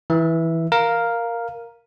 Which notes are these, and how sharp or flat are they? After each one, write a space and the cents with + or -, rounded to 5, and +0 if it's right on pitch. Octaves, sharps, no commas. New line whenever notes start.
E3 -10 E5 +0
A#4 +0 F5 +0